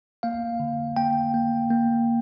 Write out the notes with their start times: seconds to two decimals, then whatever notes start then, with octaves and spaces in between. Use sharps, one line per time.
0.23 A#3 F5
0.60 D3
0.96 A#3 G5
1.34 A#3
1.70 A#3